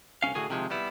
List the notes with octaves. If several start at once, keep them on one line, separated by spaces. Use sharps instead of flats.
C2 B2 C#4 F5
A2 D3 F#4 G#4 G#5
C3 D#3 F3 G#3
G3 B3 E4